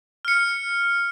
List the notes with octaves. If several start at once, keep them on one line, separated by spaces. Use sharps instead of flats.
F6 C#7